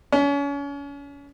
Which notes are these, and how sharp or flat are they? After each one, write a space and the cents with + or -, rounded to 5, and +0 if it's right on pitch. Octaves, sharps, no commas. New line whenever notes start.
C#4 +35